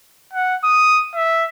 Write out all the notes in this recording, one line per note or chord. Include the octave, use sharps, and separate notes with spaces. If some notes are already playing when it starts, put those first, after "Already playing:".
F#5
D#6
E5